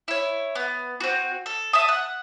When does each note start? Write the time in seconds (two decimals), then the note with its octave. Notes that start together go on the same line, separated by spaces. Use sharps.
0.08 E4 C#5
0.55 B3
1.00 C4 F#4
1.46 A4
1.73 E5 A5 D#6
1.89 F#5